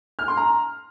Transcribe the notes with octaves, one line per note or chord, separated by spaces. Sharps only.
F6
C6
A#5